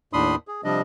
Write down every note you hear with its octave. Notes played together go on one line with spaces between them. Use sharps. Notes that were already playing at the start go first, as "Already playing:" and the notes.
D#2 A2 D4 B5 C6 D#6
G#4
C3 F3 G3 D4 D#5